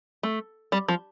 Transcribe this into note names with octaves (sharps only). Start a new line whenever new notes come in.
A3
G3
F3